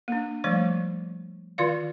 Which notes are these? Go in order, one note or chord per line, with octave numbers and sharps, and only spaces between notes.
A#3 D4
F3 G3 A3 C#5
D#3 F4 D5 F5